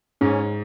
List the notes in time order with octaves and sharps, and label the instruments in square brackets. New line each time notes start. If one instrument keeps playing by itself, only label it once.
[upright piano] G#2 [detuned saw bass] C#4